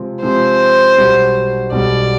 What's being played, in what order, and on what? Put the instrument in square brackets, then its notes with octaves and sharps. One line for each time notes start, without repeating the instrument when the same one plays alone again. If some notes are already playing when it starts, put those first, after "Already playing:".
Already playing: [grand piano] C3 F3 G#3 C4
[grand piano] C3 F3 G#3 C4 [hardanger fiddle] C5
[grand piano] B1 B2 G3
[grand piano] B1 B2 G3 [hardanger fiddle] D5